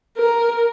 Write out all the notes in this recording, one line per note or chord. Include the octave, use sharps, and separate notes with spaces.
A#4